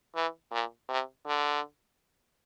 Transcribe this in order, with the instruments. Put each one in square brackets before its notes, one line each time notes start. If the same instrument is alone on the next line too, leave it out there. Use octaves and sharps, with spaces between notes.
[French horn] E3
A#2
C3
D3